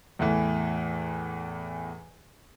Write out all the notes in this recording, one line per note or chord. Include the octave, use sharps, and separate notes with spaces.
E2 A2 E3